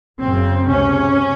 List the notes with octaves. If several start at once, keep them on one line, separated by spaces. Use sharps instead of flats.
F#1 F#2 C#3 C4
C#2 C3 C#4